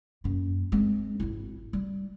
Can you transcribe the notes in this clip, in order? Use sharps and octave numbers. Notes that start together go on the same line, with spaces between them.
F#2 A#3
G#3 C4
G#1 E4
G3